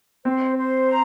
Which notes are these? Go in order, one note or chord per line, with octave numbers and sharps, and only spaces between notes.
C4 C5
C5
A#5